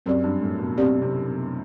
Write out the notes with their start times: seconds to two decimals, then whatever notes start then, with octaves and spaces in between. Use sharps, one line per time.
0.06 F#2 C4 G4 D5
0.24 G2
0.42 A2
0.59 B2
0.77 B2 C4 G4 D5
1.01 C3
1.25 B2